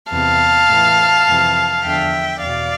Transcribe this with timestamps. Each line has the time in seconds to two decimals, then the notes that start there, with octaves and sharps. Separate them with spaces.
0.11 E2 C3 E3 F5 A5
0.69 A2 E3
1.27 F2 C3 E3
1.85 E2 D3 F3 E5 G5
2.42 E2 B2 D5 F5